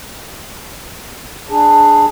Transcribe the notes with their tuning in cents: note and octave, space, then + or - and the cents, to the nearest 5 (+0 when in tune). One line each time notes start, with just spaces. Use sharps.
D4 +15 G#4 +0